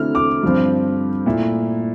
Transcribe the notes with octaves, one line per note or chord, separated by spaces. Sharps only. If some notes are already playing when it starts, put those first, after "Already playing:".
Already playing: D3 A3 C4 E4 F6
D6
G2 D3 F3 C4
A#2 A3 E4